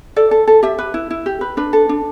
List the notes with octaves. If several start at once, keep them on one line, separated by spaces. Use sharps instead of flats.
A4 D5
A4
A4
G4 E5
B4
E4
E4
G4
B4
D4 B4
A4
D4